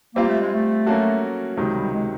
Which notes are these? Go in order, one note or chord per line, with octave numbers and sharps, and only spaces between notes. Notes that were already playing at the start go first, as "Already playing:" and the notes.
G3 A#3 C4 F4
A3
G#3
A3
F#3 A#3 C#4 F#4 A4
C#2 C3 D#3 F#3 G#3
G3
G#3